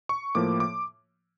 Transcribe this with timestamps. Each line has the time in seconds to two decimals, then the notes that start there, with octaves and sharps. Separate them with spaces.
0.09 C#6
0.35 A2 F3 A#3 D6
0.60 D6